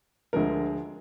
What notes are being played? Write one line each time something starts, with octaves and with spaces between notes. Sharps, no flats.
D2 D3 F3 G#3 A#4